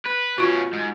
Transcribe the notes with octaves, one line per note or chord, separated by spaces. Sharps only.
B4
B2 C#4 F4 F#4
G#2